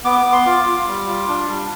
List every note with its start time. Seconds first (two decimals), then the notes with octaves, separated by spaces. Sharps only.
0.04 B3 D6
0.19 D6
0.25 B3
0.32 C6
0.46 F4 D6
0.66 F4
0.87 G3
1.08 F4
1.28 D4
1.48 G3